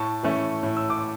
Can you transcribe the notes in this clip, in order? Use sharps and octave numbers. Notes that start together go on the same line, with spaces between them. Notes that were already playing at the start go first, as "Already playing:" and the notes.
Already playing: A2 A5 C#6
E3 A3 C#4
A2
E6
D6